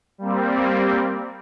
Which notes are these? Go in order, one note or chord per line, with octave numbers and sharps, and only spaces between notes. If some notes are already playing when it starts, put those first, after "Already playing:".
G3 A#3 C4